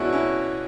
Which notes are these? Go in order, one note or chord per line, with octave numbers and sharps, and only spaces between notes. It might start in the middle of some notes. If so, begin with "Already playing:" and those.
Already playing: B2 G#3 B3 C#4 D4 E4 F#4
C#4 E4